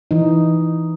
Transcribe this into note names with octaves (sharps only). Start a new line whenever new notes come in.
E3 D#4